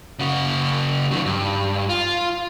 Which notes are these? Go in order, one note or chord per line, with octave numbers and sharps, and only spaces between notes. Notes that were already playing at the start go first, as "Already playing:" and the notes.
C#3 F#4
D#3 F#3
G2
F4